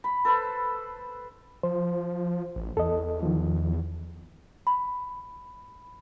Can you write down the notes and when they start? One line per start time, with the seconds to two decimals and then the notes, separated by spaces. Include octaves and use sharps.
0.04 B5
0.25 A4 B4 C5 B5
1.63 F3 C5
2.56 A1
2.77 E2 A4 D#5
3.23 D#3 F3
4.67 B5